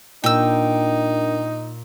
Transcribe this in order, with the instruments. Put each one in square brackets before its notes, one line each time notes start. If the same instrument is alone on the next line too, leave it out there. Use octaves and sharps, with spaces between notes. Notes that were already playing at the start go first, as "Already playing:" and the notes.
[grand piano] A#2 [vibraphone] D4 A#4 [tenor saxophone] D#4 [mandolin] G5 E6